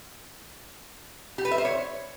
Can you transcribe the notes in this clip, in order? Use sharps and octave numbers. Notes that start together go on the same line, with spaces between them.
G4
B4
E5
C5
C#5